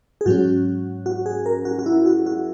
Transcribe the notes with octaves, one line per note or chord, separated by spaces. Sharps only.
G#4
G#2 F#3 C#4 F#4
F#4
G#4
A#4
F#4
F#4
E4
F#4
F#4